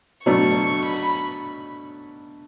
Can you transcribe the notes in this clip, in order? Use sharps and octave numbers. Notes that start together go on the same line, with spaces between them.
B2 F#3 A3 D4 C#6
B5